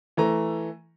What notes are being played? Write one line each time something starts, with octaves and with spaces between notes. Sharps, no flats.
E3 A3 A#5